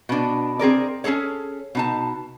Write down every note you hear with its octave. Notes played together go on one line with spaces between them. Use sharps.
B2 D4
C4 G#4 A#4 D5
C#4 D#4 G#4 A4 C#5
B2 D#4 A5